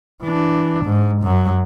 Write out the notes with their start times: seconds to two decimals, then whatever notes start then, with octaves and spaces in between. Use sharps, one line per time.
0.24 E3 D4
0.85 G#2
1.23 F#2 F#3